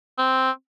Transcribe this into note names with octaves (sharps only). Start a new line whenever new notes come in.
C4